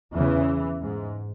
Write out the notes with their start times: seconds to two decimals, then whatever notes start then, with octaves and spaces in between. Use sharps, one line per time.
0.14 E2 C#3 E3
0.82 G#2